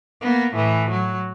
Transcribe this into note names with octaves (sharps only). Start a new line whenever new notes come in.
A#3 B3
A2 E3
F#3